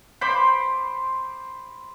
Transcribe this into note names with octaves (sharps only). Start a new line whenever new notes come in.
C5 B5 C6 D6